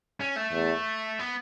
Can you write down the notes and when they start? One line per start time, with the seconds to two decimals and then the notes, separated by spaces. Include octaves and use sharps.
0.20 C#4
0.36 A3
0.52 E2
1.19 B3